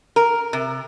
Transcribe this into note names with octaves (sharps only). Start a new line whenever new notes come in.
A#4
C3